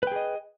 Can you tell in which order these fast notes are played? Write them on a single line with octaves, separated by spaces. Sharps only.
B4 G5 G#4 D#5